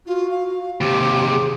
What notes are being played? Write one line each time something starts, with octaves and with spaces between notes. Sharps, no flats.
F4 F#4
F5
D#2 C3 G4 D6
G#4